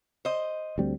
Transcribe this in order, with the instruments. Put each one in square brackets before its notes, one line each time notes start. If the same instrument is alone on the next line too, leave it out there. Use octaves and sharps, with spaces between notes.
[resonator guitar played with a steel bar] C5 D#5
[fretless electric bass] D2 G3 C4